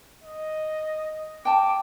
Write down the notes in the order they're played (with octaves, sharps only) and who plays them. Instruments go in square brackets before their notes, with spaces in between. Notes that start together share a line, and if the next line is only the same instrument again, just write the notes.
[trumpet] D#5
[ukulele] G5 A5 [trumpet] D6